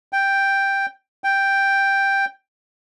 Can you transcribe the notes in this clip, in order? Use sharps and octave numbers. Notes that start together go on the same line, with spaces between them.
G5
G5